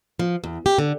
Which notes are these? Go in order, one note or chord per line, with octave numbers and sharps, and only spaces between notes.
F3
E2
G4
D3